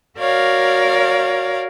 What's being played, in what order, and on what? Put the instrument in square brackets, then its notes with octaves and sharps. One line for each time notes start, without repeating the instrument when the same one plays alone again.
[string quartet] F#4 A#4 C#5 D5 F5